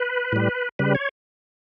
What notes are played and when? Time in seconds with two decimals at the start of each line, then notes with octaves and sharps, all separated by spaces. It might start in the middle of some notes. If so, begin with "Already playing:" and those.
Already playing: B4
0.32 A2 G3
0.79 C#3 G3 B4
0.95 C#5